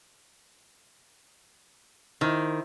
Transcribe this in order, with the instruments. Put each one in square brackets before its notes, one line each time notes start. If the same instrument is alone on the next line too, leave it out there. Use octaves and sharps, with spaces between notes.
[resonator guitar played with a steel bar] D#3 [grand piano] E4 C5 F6